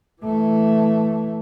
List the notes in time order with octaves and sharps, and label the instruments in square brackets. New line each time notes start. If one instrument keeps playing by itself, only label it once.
[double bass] E3 A3